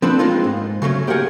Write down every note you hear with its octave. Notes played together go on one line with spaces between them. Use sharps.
F3 C4 D4 A4 B4
G#3 A#3 C4 D#4 F4
G#2
C#3 F#3 A3 C#4
A#3 G4 G#4 A#4 F#5 G#5